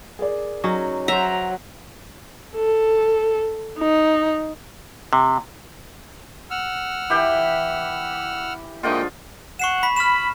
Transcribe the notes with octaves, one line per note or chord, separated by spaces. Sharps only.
G#4 A#4 D5
F#3 C#4 D#4
F#3 C5 E5 A#5
A4
D#4
C3
F#5 E6 F6
E3 G4 G5
G#2 D3 A#3 F4 D#5 G5
F#5 C#6 C7 E7
B5 B6
B5 F6 E7